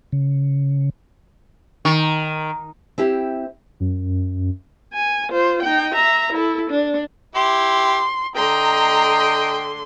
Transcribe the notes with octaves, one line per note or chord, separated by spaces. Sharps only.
C#3
D#3
C4 E4 G4
F#2
G#5
F4 C5
D#4 G5
E5 A#5
E4 A4
D4
E4 G4 C6
D3 D#5 G5 A#5 C6